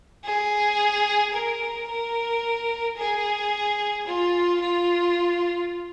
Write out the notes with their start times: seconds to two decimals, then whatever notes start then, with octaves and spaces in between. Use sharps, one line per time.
0.25 G#4
1.34 A#4
1.89 A#4
2.98 G#4
4.07 F4
4.61 F4